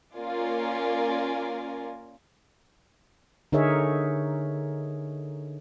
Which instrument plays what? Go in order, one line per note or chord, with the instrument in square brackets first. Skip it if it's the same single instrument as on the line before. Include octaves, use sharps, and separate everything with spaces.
[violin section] A#3 C#4 F4 A#4 D5 G#5
[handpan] D3 D#4 G#4 A#4 C#5 E5